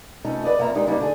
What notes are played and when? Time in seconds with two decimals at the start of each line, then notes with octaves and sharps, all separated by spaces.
0.25 F2 C3 A3 C#4 D#4
0.44 B4 D5 D#5
0.59 F2 A#3 C4 E5 A#5
0.75 G#3 D4 D#4 G4 A#4
0.86 G2 C#3 G3 A#3 D4 D#4
1.00 D3 D4 G#4